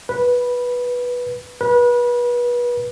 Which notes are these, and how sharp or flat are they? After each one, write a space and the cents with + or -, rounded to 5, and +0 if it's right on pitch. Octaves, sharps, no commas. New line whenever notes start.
B4 -10
B4 -30